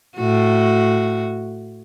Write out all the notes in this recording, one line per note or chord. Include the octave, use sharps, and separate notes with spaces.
A2 F#4